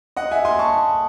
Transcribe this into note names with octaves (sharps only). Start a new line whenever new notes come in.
D#5 F#5
E5 G#5
G#5 C6
A5 C#6